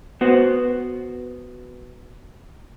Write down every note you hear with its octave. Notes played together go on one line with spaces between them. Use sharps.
B3 F#4 C5